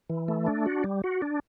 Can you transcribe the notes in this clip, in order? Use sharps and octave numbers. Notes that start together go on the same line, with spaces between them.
E3
A3
D4
F#4
G3
F#4
D4